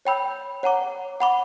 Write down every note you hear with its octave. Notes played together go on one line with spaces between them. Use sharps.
C#5 G5 B5 E6 G6
C#5 F#5 A#5 D6
F#5 B5 D6